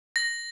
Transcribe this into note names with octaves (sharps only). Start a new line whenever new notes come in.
A#6